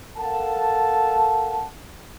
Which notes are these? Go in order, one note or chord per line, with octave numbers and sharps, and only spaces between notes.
A4 A#4 F5 F#5 A5